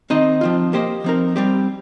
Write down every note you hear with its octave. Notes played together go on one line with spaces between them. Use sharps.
D#3 C4 D#4 C5 D#5
F3 C4 F4
A#3 G4 C5 D#5
F3 C4 D#4 A#4
G3 C4 G4